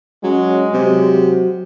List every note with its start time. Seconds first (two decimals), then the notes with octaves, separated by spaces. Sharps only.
0.24 F#3 G#3 C#4
0.73 C3 F#3